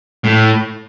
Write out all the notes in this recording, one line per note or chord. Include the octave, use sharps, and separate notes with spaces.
A2